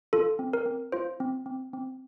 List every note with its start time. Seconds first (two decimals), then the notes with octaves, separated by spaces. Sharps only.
0.13 F4 A4
0.39 C4
0.53 A#4
0.66 C4
0.92 F4 C5
1.20 C4
1.46 C4
1.73 C4